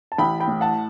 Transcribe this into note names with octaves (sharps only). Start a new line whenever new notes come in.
A5
A1 G5 B5
G5 B5
A2
F#5 A5